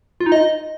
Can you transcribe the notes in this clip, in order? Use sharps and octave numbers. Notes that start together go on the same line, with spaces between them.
F4
D#4
D#5